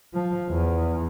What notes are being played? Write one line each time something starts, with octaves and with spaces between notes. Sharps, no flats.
F3
E2